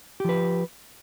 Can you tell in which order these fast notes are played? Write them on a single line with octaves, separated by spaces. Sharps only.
G4 F3 B4